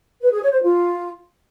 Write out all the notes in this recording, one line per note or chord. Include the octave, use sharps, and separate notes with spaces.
B4
G#4
C#5
C5
F4